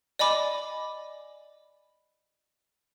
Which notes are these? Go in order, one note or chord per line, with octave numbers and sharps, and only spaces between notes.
D5 D#5 G#5 B5 D6